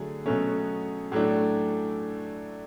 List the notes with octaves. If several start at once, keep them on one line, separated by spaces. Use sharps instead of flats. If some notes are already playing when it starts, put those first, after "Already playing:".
Already playing: D3 F#3 A3 G#4
B2 F#3 A3 C#4
A2 F#3 A3 D4